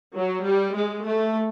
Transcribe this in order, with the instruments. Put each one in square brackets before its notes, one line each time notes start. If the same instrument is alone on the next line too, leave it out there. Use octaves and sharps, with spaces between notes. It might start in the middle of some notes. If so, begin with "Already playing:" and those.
[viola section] F#3
G3
G#3
A3